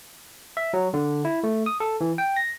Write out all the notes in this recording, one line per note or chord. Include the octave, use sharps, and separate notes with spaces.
E5
F#3
D3
E4
A3
D#6
A4
E3
G5
A#6